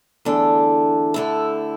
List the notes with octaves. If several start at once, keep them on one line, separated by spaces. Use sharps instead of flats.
E2 D3 A3 D4
D3 A3 E4